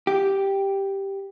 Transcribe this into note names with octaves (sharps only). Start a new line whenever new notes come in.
G4